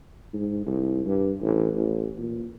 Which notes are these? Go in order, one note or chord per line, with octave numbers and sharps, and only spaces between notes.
G#2
C2
G2
A1
A1
A#2